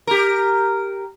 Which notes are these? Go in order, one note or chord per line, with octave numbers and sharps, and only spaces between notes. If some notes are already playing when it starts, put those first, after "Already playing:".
G4 A#4